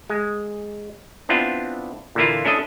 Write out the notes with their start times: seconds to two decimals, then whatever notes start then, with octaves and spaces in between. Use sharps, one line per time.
0.10 G#3
1.29 B3 C4 D4 E4 F4
2.15 A#2 D3 E3 A#3 E4 F4
2.45 C#4 D4 E4 A4 D#5